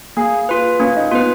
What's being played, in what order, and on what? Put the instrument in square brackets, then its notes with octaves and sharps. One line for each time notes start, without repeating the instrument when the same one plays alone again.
[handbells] A#3 [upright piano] G#4
[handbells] F4 B4
[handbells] A#3 [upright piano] C#4
[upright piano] D#4
[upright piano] B3 [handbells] F4
[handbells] B4